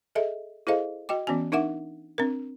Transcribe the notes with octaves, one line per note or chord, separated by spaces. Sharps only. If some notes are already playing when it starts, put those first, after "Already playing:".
G#4 A4 D#5 E5
E4 G#4 A4 C5 D#5 F5
F#4 D#5 G5 D6
E3 B3 C#4 F#4 G#5
D4 D#4 A#4 E5 F#5 D6
C4 D4 A#4